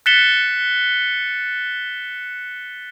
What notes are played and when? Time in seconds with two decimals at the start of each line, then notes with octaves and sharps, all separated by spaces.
0.06 F#6 A6 B6 C#7 E7 G7